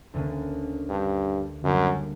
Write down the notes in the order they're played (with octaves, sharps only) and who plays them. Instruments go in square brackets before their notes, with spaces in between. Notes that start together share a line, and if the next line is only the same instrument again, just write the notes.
[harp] D2 D3 A#3 C#4
[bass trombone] G2
[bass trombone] F#2 [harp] D3 G3 A#3